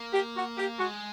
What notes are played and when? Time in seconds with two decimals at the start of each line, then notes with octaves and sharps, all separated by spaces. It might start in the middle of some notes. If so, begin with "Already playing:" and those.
Already playing: A#3
0.13 G4
0.36 F#4
0.58 G4
0.79 G#3 F#4